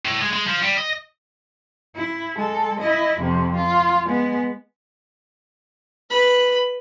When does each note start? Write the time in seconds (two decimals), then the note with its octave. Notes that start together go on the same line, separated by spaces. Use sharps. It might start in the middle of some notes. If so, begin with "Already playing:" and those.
0.06 A2
0.22 G#3
0.33 G#3
0.47 F3
0.62 G3
0.77 D#5
1.96 E4
2.36 G#3 A4
2.80 E4 D#5
3.19 F2 C3
3.57 F4
4.06 G#3 B3
6.10 B4 B5